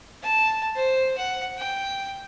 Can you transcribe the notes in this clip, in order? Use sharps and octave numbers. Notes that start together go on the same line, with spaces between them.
A5
C5
F#5
G5